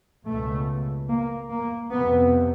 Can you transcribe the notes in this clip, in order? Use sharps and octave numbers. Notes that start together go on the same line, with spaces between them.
C#2 B2 A3
A#3
A#3
F2 C3 B3